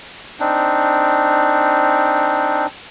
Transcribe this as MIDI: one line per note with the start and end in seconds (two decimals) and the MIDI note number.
0.40 2.67 60
0.40 2.67 62
0.40 2.67 63